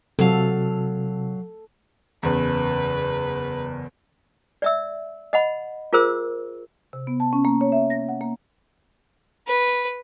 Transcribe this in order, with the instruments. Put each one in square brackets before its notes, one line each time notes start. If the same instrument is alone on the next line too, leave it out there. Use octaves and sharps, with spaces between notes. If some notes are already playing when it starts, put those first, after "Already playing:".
[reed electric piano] C3 F#4 [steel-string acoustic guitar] F#3 F5 [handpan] A4
[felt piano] F#1 E2 [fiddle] B4
[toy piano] D5 E5 E6
D#5 F#5 B5
F4 G#4 A#4 C5 E6
[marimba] C3
B3
A5
C#4
A#3
C#5
E5
A#6
F#5
A#3
[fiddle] B4